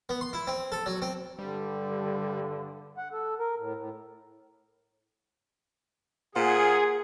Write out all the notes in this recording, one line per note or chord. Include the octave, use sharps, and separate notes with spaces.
B3
C6
E4
C4
A4
F#3
C4
G2 D3 G3
F#5
A4
A#4
A2
A2
A#2 G#4 C5 F#5